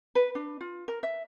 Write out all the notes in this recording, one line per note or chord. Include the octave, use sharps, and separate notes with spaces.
B4
D4
F4
A#4
E5